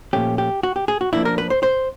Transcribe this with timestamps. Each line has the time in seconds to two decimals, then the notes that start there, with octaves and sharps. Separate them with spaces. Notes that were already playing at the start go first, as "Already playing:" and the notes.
0.13 A#2 F3 A3 C#4 G4
0.38 G4
0.63 F#4
0.76 G4
0.88 G#4
1.01 F#4
1.13 F3 A#3 D4 E4
1.25 A#4
1.38 B4
1.50 C5
1.63 C5